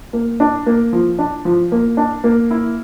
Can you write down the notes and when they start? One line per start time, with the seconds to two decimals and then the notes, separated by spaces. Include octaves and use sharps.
0.13 A#3
0.40 D4
0.66 A#3
0.93 F3
1.19 D4
1.45 F3
1.72 A#3
1.97 D4
2.24 A#3
2.51 E4